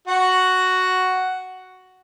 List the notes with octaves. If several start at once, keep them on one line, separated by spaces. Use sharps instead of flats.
F#4 F#5